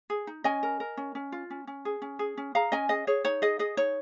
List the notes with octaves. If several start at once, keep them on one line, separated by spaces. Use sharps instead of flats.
G#4
D#4
C#4 D#5 G#5
A#4
A#4
C#4
C#4
F4
C#4
C#4
G#4
C#4
G#4
C#4
G#4 F5 A#5
C#4 D#5 G#5
G#4 D#5
G#4 C#5
D#4 C#5
G#4 D#5
G#4 D#5
D#4 C#5